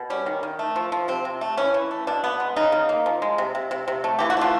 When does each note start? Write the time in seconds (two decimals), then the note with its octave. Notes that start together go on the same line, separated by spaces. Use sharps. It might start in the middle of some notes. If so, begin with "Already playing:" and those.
Already playing: B2
0.10 G3 C#4
0.26 D#3
0.43 D#3
0.59 A3
0.76 F3
0.92 F3
1.08 C3 C4
1.25 C3
1.41 A3
1.57 E3 C#4
1.74 E3
1.91 A3
2.07 B2 D4
2.24 B3
2.40 G#3
2.56 C#3 D#4
2.72 C#3
2.89 A#3
3.06 F3
3.22 G#3
3.38 C3
3.55 C3
3.71 C3
3.88 C3
4.04 A3
4.19 E3 G4
4.30 F#4
4.37 A3 F4